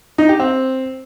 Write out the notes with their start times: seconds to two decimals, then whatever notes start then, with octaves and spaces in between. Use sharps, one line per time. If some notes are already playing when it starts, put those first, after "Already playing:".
0.18 D#4
0.29 G4
0.40 C4